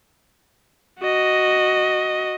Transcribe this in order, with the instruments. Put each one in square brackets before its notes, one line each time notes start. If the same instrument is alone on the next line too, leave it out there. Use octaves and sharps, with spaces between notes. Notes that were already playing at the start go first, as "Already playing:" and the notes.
[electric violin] F#4 D#5